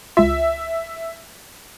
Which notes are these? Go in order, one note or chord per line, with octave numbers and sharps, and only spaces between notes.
C#2 F4 E5